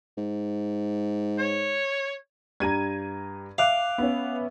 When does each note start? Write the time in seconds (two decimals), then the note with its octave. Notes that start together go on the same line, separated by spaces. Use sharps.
0.17 G#2
1.38 C#5
2.60 G2 G4 A#5 G#6 D#7
3.58 E5 F5 D6 F#6
3.98 B3 C#4